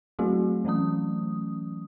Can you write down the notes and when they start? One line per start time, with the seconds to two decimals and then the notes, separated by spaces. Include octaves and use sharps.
0.19 F#3 A3 C4 E4 F#4 G#4
0.65 E3 F#3 A3 C#4 D#6